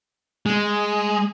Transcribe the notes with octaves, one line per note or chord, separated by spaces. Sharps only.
G#3